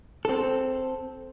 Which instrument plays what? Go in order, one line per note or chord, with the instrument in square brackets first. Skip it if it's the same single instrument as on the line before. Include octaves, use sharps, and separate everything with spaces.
[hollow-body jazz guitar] C4 A4